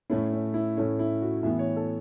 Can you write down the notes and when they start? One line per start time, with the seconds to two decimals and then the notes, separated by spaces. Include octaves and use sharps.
0.10 A2 A3 C#4 E4
0.33 C#4
0.54 E4
0.77 A2 A3 C#4
0.99 E4
1.22 F#4
1.43 A2 E3 B3 E5
1.59 C#5
1.77 A4